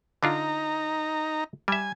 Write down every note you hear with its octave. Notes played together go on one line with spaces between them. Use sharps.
D3 D4 D#4 F4 A#5
G3 E5 G#5